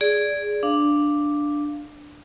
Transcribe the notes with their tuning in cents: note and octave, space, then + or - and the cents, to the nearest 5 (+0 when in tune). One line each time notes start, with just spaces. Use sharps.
G#4 +0 D5 -10
D4 +0 F5 -15